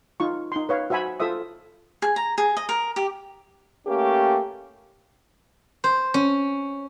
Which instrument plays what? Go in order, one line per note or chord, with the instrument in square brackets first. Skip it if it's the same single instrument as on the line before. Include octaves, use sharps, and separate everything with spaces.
[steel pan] D#4 F4 C#6
D#4 C6
B4 C#5 F5
F#4 C5 E5 G#5 B5
F4 A4 C5 E5 D#6
[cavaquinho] G#4
A#5
G#4
D#5
A#4
G4
[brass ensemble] A3 A#3 C#4 G4
[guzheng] C5
C#4